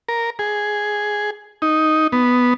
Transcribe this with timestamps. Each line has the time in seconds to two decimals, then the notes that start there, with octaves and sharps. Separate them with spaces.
0.09 A#4
0.39 G#4
1.62 D#4
2.12 B3